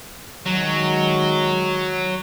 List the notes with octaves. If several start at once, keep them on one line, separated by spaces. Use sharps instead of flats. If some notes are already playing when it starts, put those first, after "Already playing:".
D#3 F#3 G#3 F#4